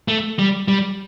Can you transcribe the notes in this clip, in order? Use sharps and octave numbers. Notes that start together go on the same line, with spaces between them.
A3
G3
G3